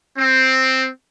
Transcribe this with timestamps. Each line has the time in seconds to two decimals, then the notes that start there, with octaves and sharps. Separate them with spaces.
0.18 C4